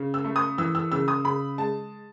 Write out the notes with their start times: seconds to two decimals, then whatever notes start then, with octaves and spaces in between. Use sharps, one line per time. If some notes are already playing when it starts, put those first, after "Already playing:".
Already playing: C#3
0.14 E6
0.24 A3
0.36 D#6
0.58 E3 E6
0.75 E6
0.92 C#3 E6
1.08 D#6
1.25 C#3 B5
1.58 G#3 A5